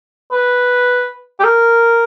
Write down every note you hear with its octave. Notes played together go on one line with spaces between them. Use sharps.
B4
G4
A#4